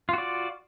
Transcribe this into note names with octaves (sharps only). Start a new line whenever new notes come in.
F4 F#4 D5